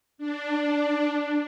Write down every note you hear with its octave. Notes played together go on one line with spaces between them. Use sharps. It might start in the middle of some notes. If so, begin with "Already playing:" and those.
D4